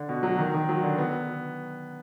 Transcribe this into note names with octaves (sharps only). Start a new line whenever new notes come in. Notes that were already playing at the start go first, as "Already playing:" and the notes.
Already playing: D3
B2
F#3
D#3
D#3
F#3
D3
B3